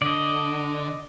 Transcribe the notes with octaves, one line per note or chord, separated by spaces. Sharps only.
D3 D5 D#5